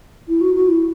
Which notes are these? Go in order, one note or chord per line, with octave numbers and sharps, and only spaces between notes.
E4
F#4
F#4
E4